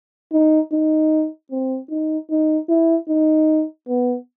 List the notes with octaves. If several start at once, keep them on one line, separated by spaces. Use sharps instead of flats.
D#4
D#4
C4
D#4
D#4
E4
D#4
B3